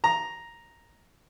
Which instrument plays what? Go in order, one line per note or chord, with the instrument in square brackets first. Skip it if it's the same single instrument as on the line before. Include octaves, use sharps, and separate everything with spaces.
[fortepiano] A#5